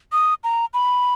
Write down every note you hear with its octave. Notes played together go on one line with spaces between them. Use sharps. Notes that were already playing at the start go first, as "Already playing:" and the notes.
D#6
A#5
B5